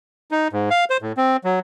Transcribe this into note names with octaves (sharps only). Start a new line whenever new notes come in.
D#4
G#2
F5
C5
A2
C4
F#3